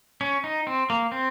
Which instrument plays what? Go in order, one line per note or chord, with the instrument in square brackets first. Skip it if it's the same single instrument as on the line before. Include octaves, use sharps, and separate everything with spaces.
[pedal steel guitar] C#4
D#4
C4
A#3
C4